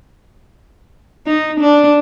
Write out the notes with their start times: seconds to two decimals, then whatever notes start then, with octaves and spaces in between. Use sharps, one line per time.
1.27 D#4
1.60 D4